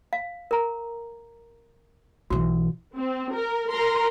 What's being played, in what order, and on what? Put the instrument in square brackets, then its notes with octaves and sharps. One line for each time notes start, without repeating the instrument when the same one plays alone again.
[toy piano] F5
A#4 A#5
[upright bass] B1 E3 [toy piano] F#4
[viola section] C4
A#4
A#4 A#5 C6